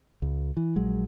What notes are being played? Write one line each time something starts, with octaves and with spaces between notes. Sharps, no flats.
C#2
E3
A#1 F#3 G#3